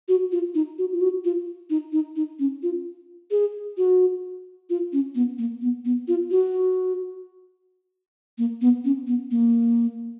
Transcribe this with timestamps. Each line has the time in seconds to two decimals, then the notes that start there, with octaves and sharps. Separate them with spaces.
0.08 F#4
0.32 F4
0.55 D#4
0.78 F#4
0.93 F4
1.01 F#4
1.24 F4
1.70 D#4
1.93 D#4
2.16 D#4
2.39 C#4
2.63 F4
3.31 G#4
3.77 F#4
4.70 F4
4.93 C#4
5.15 B3
5.39 A#3
5.62 B3
5.85 B3
6.08 F4
6.31 F#4
8.38 A#3
8.61 B3
8.85 C#4
9.07 B3
9.31 A#3